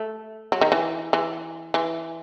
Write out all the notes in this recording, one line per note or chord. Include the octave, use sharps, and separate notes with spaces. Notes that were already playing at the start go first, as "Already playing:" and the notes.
Already playing: A3
F#3
D#3
E3
E3
E3